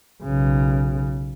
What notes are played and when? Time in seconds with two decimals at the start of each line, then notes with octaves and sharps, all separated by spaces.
0.23 B1 C#3